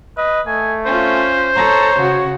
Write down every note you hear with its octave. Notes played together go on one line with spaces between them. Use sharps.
B4 D#5
A3 G#5
C#4 F4 C5
A4 C#5 A#5
C#3 F#4